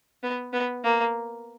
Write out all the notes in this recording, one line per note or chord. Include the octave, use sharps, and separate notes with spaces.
B3
B3
A#3